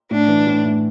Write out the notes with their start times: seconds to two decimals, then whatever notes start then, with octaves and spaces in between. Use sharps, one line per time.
0.11 A2 D4
0.28 E3
0.47 A2
0.65 A2